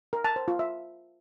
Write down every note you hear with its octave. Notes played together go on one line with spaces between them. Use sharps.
A#4
A5
C5
F4
E5